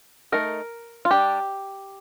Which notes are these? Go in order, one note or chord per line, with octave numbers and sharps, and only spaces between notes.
A3 D#4 A#4
F4
G3 D4 G4